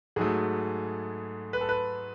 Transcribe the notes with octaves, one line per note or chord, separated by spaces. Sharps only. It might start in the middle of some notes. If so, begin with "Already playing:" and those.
G#2 F#3 A3 G#4
B4
A4
B4